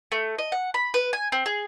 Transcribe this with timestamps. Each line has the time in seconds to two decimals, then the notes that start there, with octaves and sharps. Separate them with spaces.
0.12 A3
0.38 D#5
0.52 F#5
0.74 B5
0.94 B4
1.13 G#5
1.32 C4
1.46 G#4